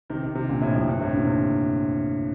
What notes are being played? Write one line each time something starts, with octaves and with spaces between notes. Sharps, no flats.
C3 D#3
C3 D#3
C3 D#3
A#2 D3
A2 C3
F2 A2
G2
A2 C3
A#2 D3
C3 D#3